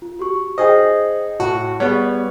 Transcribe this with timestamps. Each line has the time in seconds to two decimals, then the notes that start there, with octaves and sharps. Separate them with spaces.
0.02 F4
0.19 F#4 G4 C#6
0.58 D#4 G#4 C5 D#5 G5
1.40 A2 F#4 A5
1.80 G3 B3 G#4 C#5